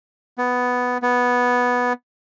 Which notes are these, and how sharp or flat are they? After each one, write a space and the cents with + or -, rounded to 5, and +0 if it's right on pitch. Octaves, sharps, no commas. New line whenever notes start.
B3 +5
B3 -5